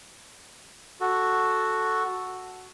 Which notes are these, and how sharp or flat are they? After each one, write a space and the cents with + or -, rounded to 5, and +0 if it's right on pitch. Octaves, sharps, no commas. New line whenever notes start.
F#4 +0 A4 +0